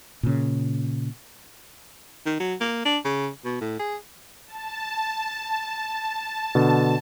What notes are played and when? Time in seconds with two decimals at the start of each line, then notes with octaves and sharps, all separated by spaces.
0.23 A#2 C#3
2.26 D#3
2.40 F#3
2.60 A#3
2.85 D4
3.05 C#3
3.44 B2
3.61 A2
3.79 G#4
4.47 A5
6.55 B2 D3